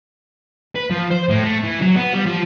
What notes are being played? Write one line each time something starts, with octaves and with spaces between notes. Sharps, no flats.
B4
F3
C5
A2
A3
E3
F#3
B3
G3
F3